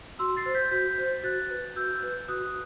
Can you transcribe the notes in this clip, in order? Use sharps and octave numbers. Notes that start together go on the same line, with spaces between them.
F#4 C6 E6
A6 C7
C5
G6 B6
F#4 G6 B6
C5
F#4 F#6 A6
B4
F#4 E6 G6
B4
F#4 D#6 F#6